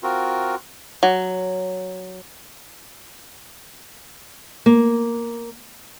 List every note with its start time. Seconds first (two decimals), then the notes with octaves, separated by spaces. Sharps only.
0.03 C4 F4 F#4 A#4
1.03 F#3
4.66 A#3